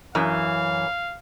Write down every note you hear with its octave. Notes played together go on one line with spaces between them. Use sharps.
F#2 E3 F5